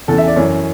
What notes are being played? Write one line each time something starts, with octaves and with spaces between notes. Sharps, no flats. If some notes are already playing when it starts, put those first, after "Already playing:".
E2 C#3 E3 A4
E5
D5
F#2 E3 C#5